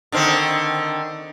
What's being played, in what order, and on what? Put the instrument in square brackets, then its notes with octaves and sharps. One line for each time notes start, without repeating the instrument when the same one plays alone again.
[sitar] D3 D#3 C4